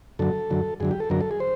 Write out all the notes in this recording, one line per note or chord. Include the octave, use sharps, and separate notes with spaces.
F#2 D3 F#3 A4
F#2 D3 F#3
F#2 D3 F#3 G#4
G4
A4
F#2 D3 F#3 A#4
A4
G#4
C5